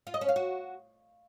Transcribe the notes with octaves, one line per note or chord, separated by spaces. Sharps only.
F4
D#5
C#4
F5
F#4